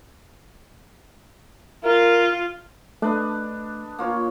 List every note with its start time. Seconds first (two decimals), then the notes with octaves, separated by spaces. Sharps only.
1.84 F4 A#4
3.02 A3 D4 B4 D#5
3.99 A#3 F4 C#5